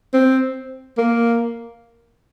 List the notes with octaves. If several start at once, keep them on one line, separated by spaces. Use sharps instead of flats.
C4
A#3